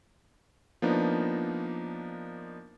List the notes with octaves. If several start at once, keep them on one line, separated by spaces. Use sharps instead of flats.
F3 A#3 B3 D4 D#4